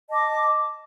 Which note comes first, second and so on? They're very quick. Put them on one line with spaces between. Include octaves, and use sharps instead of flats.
D#5 A5 D6